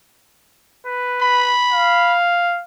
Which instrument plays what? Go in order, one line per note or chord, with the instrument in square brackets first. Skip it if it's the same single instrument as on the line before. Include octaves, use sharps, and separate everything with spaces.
[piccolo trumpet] B4
[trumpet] B5
[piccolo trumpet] F5